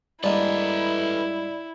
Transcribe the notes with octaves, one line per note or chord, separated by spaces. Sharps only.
G2 G#3 A#3 E4 A4 B4 D5